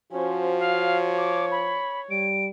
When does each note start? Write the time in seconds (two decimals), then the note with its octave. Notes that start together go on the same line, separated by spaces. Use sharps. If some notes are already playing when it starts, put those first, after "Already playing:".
0.13 F3 C#4 F#4 C5
0.59 C#5 F5
1.18 D6
1.51 B5
2.11 G3 D7